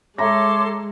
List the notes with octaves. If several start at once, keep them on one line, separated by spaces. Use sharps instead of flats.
G#3 A4 C#5 E5 A#5 C6 D6 A#6